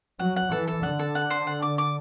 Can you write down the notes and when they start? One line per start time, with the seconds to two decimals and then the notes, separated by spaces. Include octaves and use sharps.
0.19 F#3 F#5
0.36 F#5
0.52 E3 A4
0.68 A4
0.83 D3 F#5
0.99 A4
1.15 F#5
1.30 C5
1.47 F#5
1.62 D6
1.78 D6